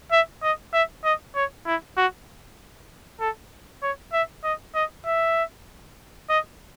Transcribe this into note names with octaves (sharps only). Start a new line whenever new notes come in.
E5
D#5
E5
D#5
C#5
E4
F#4
A4
C#5
E5
D#5
D#5
E5
D#5